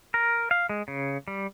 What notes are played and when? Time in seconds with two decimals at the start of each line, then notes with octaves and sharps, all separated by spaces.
0.14 A#4
0.51 F5
0.69 G#3
0.88 C#3
1.28 G3